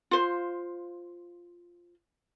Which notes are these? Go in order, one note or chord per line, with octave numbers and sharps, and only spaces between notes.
F4 C5